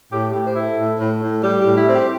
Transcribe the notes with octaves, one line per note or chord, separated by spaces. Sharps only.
A2 G4
G4
A2
C5
E4
A4
A2
A2
A2
G3 G4
G4
A2
E4
C4
G4